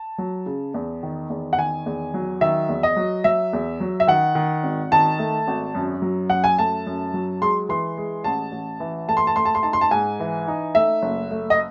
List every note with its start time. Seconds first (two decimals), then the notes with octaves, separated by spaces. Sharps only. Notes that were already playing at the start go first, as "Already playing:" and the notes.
Already playing: A5
0.18 F#3
0.46 C#3
0.74 E2
1.03 D#3
1.30 E2
1.53 F#5
1.58 D#3 G#5
1.86 E2
2.14 F#3
2.41 D#3 E5
2.69 E2
2.83 D#5
2.97 F#3
3.24 F#3 E5
3.53 E2
3.80 F#3
4.00 E5
4.07 D#3 F#5
4.35 D#3
4.63 G#1
4.91 D#3 A5
5.19 A3
5.48 G#1
5.75 F#2
6.02 F#3
6.30 F#2 F#5
6.44 G#5
6.59 A3 A5
6.86 F#2
7.14 F#3
7.42 G#3 C6
7.69 E3 C6
7.97 G#3
8.24 A1 A5
8.52 A1
8.80 E3
9.08 A3 A5
9.17 C6
9.27 A5
9.35 A3 C6
9.45 A5
9.55 C6
9.63 D#4 A5
9.73 C6
9.81 A5
9.91 G#2 G#5
10.20 E3
10.48 D#4
10.75 A3 E5
11.02 F#1
11.31 A3
11.50 D#5